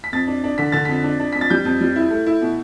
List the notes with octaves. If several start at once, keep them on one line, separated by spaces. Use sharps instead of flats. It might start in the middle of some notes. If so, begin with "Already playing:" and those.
B6
F2 A6
D4
D4
D3 B6
D3 A6
F2 B6
D4
D4
F2 B6
A6
G3 G6
F2
G3
E4
A3
E4
B2